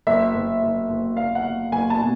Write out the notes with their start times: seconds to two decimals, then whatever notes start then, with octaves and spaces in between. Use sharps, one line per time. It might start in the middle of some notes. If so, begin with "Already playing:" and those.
0.07 F#1 E5
0.35 F#1
0.62 F#1
0.89 F#1
1.17 F#1 F5
1.35 F#5
1.44 F#1
1.72 F#1 G#5
1.90 A5
1.99 B2